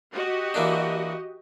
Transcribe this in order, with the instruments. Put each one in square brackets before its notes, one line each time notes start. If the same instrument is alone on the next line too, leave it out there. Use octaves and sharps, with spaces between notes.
[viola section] F#4 G4 D#5
[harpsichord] E3 A#3 D4